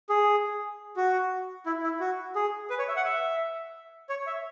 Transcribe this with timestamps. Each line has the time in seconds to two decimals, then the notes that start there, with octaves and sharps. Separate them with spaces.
0.09 G#4
0.96 F#4
1.66 E4
1.83 E4
2.00 F#4
2.35 G#4
2.70 B4
2.79 C#5
2.88 E5
2.96 F#5
3.05 E5
4.09 C#5
4.27 E5